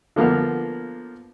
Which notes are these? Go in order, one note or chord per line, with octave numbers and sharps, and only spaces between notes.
D3 F3 A#3 B3 F6